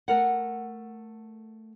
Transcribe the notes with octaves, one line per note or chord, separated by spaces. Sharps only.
A3 A#4 F#5